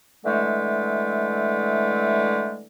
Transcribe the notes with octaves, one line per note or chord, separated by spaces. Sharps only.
D3 E3 G#3 A3